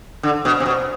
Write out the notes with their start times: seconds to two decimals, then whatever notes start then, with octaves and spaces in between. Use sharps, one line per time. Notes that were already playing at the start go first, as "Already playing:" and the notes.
0.23 D3
0.45 B2
0.60 C3
0.66 B2